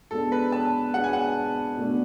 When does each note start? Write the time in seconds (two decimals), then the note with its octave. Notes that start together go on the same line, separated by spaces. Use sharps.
0.11 B2 G#3 B3 D4 A4
0.32 B4
0.52 A5
0.94 B2 G#3 B3 D4 F#5
1.04 G#5
1.13 F#5
1.77 B2 A3 D4